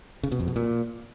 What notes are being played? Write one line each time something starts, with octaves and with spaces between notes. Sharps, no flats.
C#3
B2
F2
B2
A#2